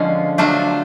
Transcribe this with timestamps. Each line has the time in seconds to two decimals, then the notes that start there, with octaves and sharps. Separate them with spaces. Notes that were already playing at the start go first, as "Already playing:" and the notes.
Already playing: D3 F3 G#3 C#4 F4
0.38 F#3 A3 D4 F4